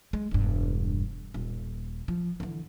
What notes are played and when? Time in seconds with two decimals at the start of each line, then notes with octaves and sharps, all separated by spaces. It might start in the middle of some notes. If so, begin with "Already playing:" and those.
0.13 G#3
0.31 E1 G2
1.34 D#1
2.08 F3
2.40 D3 E3